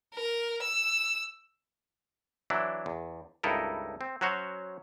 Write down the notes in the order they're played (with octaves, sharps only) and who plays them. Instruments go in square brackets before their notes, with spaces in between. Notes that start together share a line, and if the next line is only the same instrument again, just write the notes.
[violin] A#4
E6
[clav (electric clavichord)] E3 F#3 D4 E4
E2
C#2 G2 D#4 E4 A4 A#4
C4
F#3 C#4 F#4 C5 C#5